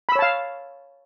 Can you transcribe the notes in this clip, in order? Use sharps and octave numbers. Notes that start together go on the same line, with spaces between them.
C#5 F5 A5 B5 E6